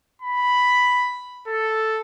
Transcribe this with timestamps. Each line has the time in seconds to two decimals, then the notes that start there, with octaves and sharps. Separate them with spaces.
0.22 B5
1.47 A4